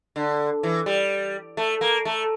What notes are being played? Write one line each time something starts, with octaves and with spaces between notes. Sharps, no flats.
D3
E3
G3
A3
A#3
A3